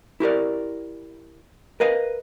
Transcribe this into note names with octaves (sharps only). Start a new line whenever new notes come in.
E4 G4 A#4 D5
A#4 B4 D#5 F5